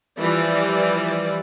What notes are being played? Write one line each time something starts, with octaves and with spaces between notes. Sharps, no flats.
E3 F3 G3 D5